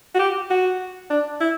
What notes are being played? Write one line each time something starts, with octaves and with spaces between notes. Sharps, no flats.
F#4
G4
F#4
D4
E4